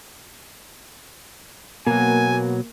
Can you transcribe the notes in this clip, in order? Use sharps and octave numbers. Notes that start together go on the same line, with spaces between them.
B2 F#3 A#3 G#5